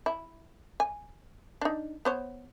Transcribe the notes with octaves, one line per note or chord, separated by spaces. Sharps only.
E4
G#5
D4 D#4
B3 C5 C#5